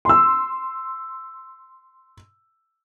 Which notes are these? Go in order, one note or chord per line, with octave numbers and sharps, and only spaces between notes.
C6 E6